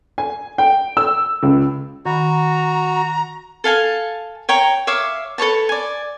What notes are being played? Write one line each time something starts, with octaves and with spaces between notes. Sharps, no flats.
G#5
G5
E6
C#2
D#3 F#4 A#5 B5
A4 F5 G#5 A5
C#5 G5 A#5
C#5 E5 F5 D6
A4 B4 C#5 A5
D5 G#5